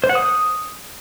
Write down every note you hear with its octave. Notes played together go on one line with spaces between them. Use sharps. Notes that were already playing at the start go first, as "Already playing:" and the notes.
C5
F#5
D#6